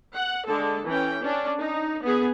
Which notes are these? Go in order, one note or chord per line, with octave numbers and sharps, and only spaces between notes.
F#5
D3 G#3 A4
E3 C#4 G5
C#4 D4
D#4
B3 G#4